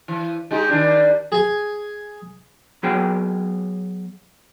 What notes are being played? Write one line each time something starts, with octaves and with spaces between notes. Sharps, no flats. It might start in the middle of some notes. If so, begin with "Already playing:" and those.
E3
G#3 D#4 G4
D#3 G3 D4
G#4 G#5
F#3 B3 G#4 G5